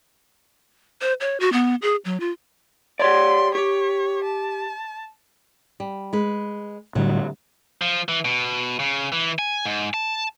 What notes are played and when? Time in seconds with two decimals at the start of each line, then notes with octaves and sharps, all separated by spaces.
1.02 C5
1.21 C#5
1.40 F#4
1.53 B3
1.82 G#4
2.05 F#3
2.20 F4
2.99 G4 C#5 D5 C6
3.55 G4 C#5
4.24 A5
5.80 G3
6.13 G#3 B4
6.95 A2 D3 F#3 G3
7.81 F3
8.09 E3
8.25 B2
8.79 C#3
9.12 E3
9.39 G#5
9.66 G#2
9.94 A5